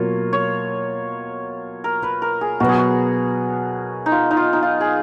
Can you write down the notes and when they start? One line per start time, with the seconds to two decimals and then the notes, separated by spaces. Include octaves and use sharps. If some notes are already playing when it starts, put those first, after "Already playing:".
Already playing: B2 F#3 A#3 F4 C#5
0.33 C#5
1.84 A#4
2.03 B4
2.22 A#4
2.41 G#4
2.60 B2 F#3 B3 F#4
2.69 G#4
2.78 F#4
4.06 D#4
4.12 F4
4.31 D#4
4.37 F4
4.53 D#4
4.63 F4
4.81 G#4